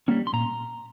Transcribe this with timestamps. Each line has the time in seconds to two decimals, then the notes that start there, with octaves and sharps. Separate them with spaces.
0.08 G3 A#3 C#4
0.27 C6
0.33 A#2 A#5